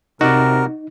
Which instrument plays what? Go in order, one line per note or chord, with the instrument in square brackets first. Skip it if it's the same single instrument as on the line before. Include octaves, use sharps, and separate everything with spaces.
[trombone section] C3 [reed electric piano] D#4 [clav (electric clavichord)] F#4 D5 [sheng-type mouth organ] A#4